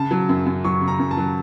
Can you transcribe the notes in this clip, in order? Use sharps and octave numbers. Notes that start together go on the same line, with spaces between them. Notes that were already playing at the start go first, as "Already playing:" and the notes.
Already playing: C#3 A5
F#3
F#2
F#2
F#3 C#6
C#3
A#5
F#2
A5
F#3